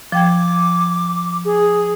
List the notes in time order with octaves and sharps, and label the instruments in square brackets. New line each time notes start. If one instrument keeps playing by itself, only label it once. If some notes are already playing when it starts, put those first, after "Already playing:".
[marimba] F3 G5 G#6 [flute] D6
[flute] G#4